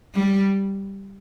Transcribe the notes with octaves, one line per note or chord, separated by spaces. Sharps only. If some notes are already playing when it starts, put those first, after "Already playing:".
G3